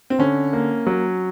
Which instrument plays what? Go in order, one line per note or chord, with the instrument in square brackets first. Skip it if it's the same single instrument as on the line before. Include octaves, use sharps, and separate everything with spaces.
[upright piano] C4
[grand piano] D3 [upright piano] C#4
[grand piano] A#3
F#3